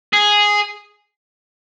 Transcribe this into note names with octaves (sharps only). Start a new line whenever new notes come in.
G#4